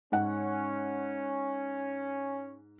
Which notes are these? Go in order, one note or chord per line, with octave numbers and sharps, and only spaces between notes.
G#2 C#4 F#5